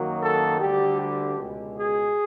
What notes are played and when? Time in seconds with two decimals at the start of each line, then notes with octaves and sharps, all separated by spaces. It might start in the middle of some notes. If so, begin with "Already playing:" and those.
Already playing: F#2 D#3 F#3 A#3
0.21 A4
0.59 D2 D3 G3 G4
0.99 G4
1.38 C#2 B2 G#3
1.76 G#4